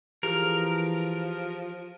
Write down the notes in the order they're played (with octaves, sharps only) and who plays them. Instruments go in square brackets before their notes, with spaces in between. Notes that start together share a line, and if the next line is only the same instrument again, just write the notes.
[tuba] E3 [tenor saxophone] F3 [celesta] G4 G#4 F6 [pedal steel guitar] A#4